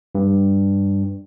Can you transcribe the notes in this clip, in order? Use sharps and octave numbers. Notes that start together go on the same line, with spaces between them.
G2